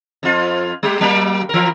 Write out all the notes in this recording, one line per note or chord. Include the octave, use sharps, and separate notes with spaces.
F2 F4
G3 G4
F#3 A#3
E3 A#4